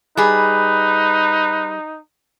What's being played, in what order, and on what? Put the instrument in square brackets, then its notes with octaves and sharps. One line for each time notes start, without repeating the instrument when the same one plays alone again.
[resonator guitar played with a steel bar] G3 G#4 [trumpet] D#4 [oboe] B4